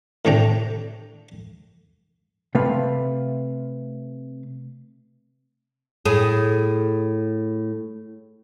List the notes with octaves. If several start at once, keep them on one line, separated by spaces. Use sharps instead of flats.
A2 C3 A3 D4 G5 A#5
C3 A3 B4 F5
A2 G#4